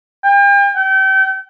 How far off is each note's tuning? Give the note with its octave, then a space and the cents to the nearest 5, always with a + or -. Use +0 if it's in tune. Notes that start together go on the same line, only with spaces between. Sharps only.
G5 +40
G5 -35